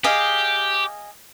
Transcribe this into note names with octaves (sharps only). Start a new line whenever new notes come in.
G4 G#4 D#5 F5